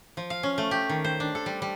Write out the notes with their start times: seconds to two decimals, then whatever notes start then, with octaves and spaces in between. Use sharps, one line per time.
0.17 F3
0.30 F5
0.43 C#4
0.58 A3
0.71 G4
0.89 D#3
1.04 C5
1.20 D4
1.35 A4
1.46 G3
1.62 G3